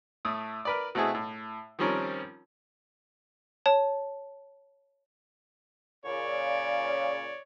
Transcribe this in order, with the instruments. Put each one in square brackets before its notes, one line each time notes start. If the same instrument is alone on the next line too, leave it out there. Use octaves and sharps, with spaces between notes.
[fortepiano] A2 A3 D#6
A#4 B4 D5
B2 A3 C4 E4 G#4
A2
D#3 F3 G3 C4 C#4 A#4
[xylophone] C#5 A5
[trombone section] A#2 C#3 [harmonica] C#5 D5